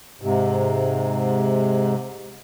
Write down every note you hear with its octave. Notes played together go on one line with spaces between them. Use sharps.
G#2 C3